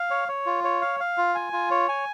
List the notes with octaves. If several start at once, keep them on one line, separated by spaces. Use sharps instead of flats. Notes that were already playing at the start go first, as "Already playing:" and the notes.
Already playing: F5
C#5
C#5
F4
C#5
F5
F5
F4
G#5
F4
C#5
G#5